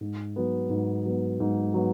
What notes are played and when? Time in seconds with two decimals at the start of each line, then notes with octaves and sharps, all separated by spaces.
0.01 G#2
0.36 F#3 B3
0.70 G#2
1.05 F#3 B3
1.40 G#2
1.74 F#3 B3